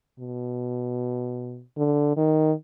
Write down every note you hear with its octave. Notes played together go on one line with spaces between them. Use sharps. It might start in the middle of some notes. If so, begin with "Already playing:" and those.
B2
D3
D#3